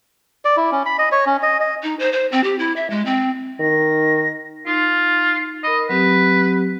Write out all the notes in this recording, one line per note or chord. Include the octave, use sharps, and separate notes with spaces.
D5
E4
C#4
B5
D#5
C#5
C#4
D#5
D#5
D#4
C5
C5
C4
G4
E4
E5
G#3
C4
D#3 A#6
D#4 F4
A#4 D#5 B5
F#3 C4 G4 B4